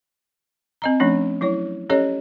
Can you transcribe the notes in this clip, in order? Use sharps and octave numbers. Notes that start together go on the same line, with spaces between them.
C4 D#5 A#5
F3 A3 C#4 D4
F#3 E4 C#5
C#4 G4 A4 C#5 D#5